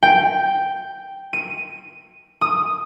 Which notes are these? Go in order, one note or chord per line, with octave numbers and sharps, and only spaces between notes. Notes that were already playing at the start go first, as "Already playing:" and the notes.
G5
D#7
D#6